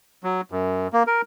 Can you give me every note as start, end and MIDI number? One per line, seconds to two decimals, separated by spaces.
0.23 0.41 54
0.52 0.88 42
0.93 1.03 58
1.07 1.22 70